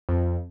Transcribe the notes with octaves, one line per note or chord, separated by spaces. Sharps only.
F2